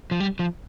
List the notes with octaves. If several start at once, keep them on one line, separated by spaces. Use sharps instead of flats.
F3
G3
F3